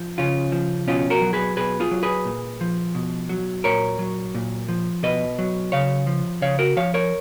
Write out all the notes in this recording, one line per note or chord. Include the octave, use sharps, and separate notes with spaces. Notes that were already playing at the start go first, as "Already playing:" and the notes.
Already playing: F3
C#3 C#4 F4
F3
B2 C#4 F4
F#4 A#4
F#3
G#4 B4
B2 G#4 B4
F4 G#4
F#3
G#4 B4
A#2
F3
B2
F#3
A#2 A#4 C#5
F#3
A#2
F3
B2 B4 D#5
F#3
C#3 C#5 F5
F3
C#3 C#5 F5
F#4 A#4
F3 C#5 F5
A#4 C#5